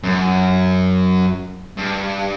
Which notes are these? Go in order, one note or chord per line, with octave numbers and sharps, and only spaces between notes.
F#2
G2